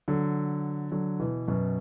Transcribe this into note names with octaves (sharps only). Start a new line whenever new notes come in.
D3 F#3
D3 F#3
B2 E3
F#2 B2